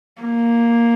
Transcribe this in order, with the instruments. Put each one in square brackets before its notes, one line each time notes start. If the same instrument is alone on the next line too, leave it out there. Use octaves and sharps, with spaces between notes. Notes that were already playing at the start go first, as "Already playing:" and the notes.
[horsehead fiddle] A#3